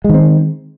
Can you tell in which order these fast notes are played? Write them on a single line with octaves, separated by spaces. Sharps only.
G#3 D#3 C4